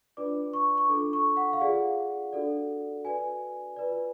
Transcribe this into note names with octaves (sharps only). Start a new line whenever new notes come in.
D4 F4 B4 D5 D6
C#6
C#6
D4 F4 A4 D6
C#6
F#5
F5
F4 G#4 D5 F#5
D4 F#4 A4 D5
F#4 B4 D5 G#5
F4 B4 D5